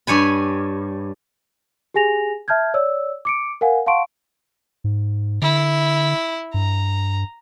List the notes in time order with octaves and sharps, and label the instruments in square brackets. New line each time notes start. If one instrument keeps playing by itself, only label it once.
[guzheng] G2 C#5 G#5 B5
[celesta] G4 G#4 G#5 A#6 F7
E5 A5 F6 G6 G#6
C#5 D5 E6
D6 C#7 D7
A#4 F5 F#5 G#5
F5 F#5 A5 C6 C#6 D7
[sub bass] G#2
[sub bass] D3 [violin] E4
[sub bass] G2 [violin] A#5